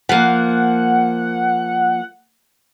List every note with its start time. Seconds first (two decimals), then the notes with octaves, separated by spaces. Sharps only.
0.09 F3 A#3 F#5